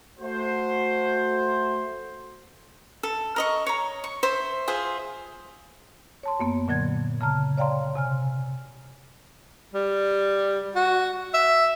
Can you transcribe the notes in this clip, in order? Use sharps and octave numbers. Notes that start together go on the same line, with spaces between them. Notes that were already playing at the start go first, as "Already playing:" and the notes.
A3 F#4 C5
A4
A#4 D#5 C#6
C#5 A#5
C#6
C5 E5
F4 G#4 C5 E5
C#5 A5 C6
F#2 A#3 B3
A#2 D3 F#3 G#6
C#3 A5 A#5 F6
C#5 D5 F5 G5 A#5 C6
C3 G#5 F6
G3
F#4
E5